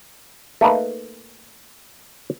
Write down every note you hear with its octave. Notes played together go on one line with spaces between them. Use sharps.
A3 A#3 D#4 B4